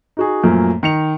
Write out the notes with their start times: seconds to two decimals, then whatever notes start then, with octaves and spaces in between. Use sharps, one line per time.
0.17 D#4 F#4 G#4
0.44 F#2 A#2 F3 A3 A#3
0.83 D#3 C#7 F7